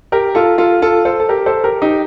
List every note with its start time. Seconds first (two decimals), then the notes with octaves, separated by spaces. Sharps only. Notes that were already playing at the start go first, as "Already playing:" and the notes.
0.12 G4 A#4
0.35 F4 A4
0.58 F4 A4
0.82 F4 A4
1.05 A4 C5
1.20 A4
1.29 G4 A#4
1.46 A4 C5
1.64 G4 A#4
1.82 D#4 G4